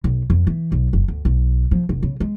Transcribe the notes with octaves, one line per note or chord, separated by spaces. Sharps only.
B1
F2
E3
B1
F#1
D2
B1
F3
F1
C#3
G#3